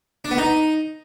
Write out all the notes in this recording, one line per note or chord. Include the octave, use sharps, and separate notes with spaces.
D4
B3
D#4